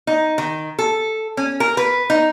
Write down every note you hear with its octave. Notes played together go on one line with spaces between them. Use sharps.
D#4
D#3
A4
C#4
A#4
B4
D#4